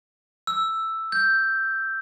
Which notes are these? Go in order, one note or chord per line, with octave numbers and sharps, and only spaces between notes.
E6
G6